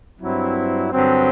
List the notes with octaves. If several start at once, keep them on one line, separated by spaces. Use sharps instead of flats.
G2 F#3 C4 E4
G2 D3 F#3 C4